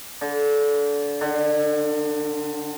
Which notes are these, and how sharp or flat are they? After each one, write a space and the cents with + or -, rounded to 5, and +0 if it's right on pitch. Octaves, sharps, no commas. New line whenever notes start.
D3 -25
D3 +35